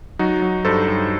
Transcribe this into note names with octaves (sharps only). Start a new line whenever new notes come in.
F#3 D#4 F#4
F#3
G2 A4 C5
G2